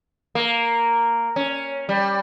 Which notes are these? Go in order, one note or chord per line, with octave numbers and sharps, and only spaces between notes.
A#3
C#4
G3